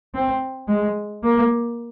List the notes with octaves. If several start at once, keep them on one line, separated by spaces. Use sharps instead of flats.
C4
G#3
A#3